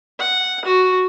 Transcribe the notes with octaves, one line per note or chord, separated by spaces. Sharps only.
F#5
F#4